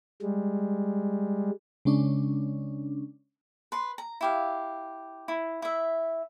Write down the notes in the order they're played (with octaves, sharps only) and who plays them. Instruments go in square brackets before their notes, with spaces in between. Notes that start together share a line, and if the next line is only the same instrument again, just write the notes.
[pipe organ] G3 G#3
[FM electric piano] C#3 G#3 C#4 D4
[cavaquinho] B4 C6
A#5
E4 G4 F5
E4
E4 E5